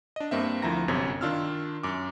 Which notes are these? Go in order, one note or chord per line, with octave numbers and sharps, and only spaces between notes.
D4 D#5
G2 A#3 C4 E5
D2 F3 E4 A#5 A#6
G1 F#2 C3 C#5 G#6
D#3 D4 F4 E6 F6
F#2 D6